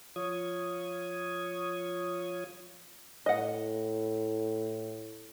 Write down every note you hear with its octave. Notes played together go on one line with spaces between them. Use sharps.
F3 F4 C#5 D#6 G#6
A2 D#5 F#5